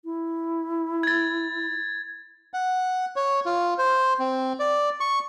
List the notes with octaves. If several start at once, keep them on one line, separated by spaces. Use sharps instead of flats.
E4
G#6 A6
F#5
C#5
F4
C5
C4
D5
C#6